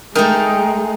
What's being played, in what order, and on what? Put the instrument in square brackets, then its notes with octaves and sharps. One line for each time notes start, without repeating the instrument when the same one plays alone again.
[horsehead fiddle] G#3 [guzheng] A3 D#4 [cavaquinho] A#4 G5